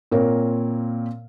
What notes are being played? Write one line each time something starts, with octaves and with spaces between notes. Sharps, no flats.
A#2 C4 A#4 C#5